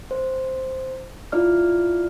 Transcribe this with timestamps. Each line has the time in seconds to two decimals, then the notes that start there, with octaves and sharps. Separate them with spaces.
0.11 C5
1.32 E4 F4 D5 F6